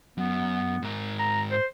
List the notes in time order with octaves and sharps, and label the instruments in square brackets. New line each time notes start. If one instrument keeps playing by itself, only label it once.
[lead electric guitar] F#2 [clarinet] B3
[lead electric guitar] G#2 A#4
[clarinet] A#5
C5